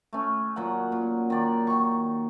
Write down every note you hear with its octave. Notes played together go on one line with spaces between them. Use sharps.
A3 C#4
A#2 F#3 F#5
A#2
D#3 D5
D#3 C#6